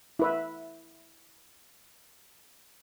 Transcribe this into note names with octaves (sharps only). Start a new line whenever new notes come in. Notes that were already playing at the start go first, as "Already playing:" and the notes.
E4 B4 E5